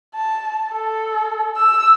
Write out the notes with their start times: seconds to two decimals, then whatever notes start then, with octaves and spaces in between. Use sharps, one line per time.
0.15 A5
0.71 A4
1.57 E6